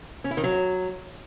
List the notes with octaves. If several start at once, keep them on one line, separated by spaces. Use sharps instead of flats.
C#4
E4
D#3
F#3